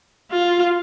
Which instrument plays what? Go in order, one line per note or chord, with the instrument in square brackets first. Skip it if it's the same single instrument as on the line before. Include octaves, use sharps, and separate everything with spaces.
[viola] F4